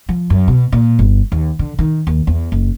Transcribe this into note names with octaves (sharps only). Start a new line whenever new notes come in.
F3
F#2
B2
A#2
G1
D#2
D3
D#3
D#2
E2
F#1